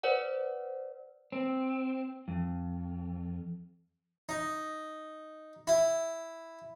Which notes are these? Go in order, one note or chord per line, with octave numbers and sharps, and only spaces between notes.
B4 C5 D5 F#5
C4
F2
D#4
E4